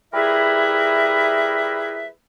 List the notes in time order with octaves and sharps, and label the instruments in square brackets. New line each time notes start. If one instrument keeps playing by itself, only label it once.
[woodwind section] G3 E4 G#4 A#4 B4 E5